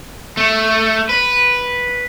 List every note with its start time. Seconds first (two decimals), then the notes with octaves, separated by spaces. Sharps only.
0.37 A3
1.09 B4